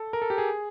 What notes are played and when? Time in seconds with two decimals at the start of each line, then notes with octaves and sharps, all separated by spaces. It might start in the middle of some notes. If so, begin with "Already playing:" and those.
Already playing: A4
0.13 A#4
0.22 A4
0.30 G4
0.38 G#4